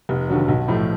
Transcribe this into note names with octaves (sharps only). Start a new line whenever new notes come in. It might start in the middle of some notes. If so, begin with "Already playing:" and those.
F1
D#2 D3 F#3
B1
A2 F3 A3